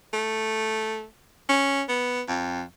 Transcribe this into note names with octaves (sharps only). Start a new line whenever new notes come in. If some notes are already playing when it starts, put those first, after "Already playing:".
A3
C#4
B3
F2